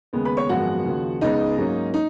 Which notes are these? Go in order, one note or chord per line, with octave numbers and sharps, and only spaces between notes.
D#2 C#3 G#3 B3
B4 B5
C#5 C#6
G#1 F#2 F3 G#3 B3 F#4 F#5
D#2 C#3 F3
C#2 C#3 G#3 B3 D#4 D#5
G#2 F#3 A#3 C#4
D#4